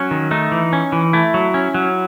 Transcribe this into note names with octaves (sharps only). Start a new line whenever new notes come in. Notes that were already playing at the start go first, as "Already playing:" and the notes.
Already playing: F#3 C#4 F#4
D#3
A3 D#4
E3
C#4
E3
A3 E4
F#3
C#4
F#3